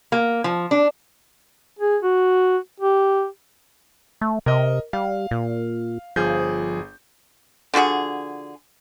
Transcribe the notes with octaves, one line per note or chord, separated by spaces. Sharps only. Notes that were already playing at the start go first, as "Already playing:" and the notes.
A#3
F3
D4
G#4
F#4
G4
A3
C3 A#4 D#5
G3 F5
A#2
G1 F3 G#4 G6
D3 F3 F#4 G#4